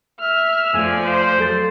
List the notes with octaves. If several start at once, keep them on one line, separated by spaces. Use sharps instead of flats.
E5 F6
F2 F3 A3 D5 G#5
C5
F#3 A4 A6